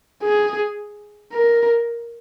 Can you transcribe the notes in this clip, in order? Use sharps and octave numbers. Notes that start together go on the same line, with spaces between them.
G#4
A#4